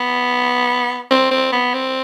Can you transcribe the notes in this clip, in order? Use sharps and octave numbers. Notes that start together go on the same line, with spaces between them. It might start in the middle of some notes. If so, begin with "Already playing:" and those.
Already playing: B3
C4
C4
B3
C4